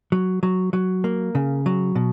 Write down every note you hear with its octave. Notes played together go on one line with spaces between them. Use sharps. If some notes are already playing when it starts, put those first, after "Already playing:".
F#3
F#3
F#3
A#3
C#3
F#3
B2